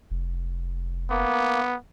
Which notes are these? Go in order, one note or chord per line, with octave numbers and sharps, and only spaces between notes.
F1
A#3 B3